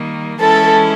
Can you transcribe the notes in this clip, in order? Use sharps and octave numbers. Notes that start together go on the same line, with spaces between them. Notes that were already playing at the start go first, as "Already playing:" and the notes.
Already playing: D#3 G3 A#3
E3 G#3 C#4 E4 A4